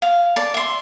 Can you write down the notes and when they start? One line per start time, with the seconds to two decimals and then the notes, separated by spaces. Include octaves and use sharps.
0.02 F5
0.36 D5 A5
0.54 E5 C6